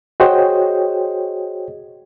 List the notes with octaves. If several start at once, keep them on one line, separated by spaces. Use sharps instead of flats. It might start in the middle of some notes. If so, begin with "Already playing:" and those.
F#4 G#4 C5 C#5 D#5 G5